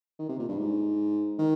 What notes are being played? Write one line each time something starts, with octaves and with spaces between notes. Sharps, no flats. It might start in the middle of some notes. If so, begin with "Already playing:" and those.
D#3
C3
A#2
G2
G#2
D#3